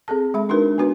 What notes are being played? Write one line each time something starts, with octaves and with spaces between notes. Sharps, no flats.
C4 G#4 A4 A5
G#3 E5 B5
D4 D#4 F#4 A#4 B4
B3 D4 F#4 B4